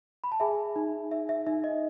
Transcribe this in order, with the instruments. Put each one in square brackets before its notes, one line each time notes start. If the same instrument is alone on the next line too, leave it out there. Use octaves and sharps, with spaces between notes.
[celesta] B5
A5
G#4 E5 G#5
D#4
D#4 E5
E5
D#4 E5
D#5